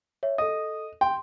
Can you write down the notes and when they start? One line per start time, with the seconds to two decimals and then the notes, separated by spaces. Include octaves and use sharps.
0.23 C#5 E5
0.38 A4 D#5 D#6
1.01 G5 C6